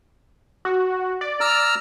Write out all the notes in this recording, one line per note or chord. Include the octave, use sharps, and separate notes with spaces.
F#4
D5
A#5 E6 F6